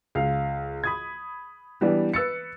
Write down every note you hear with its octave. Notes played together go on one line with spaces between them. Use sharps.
C#2 F5
B5 D#6 G#6
E3 G3 B3 D4 G4
B4 E6 A6 C#7